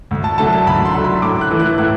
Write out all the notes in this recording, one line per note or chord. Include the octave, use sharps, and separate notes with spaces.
D2
A5
D3 F#3 A3 A5
A5
D2 B5
C6
D3 F#3 A3
B5
A2 D6
F#6
E3 A3 E4
F#6
A2 F#6